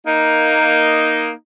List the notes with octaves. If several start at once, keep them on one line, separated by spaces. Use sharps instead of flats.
A#3 D#4